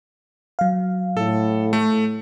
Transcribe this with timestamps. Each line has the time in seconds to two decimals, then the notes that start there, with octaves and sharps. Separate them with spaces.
0.59 F#3 F5
1.17 A2 A4
1.73 A3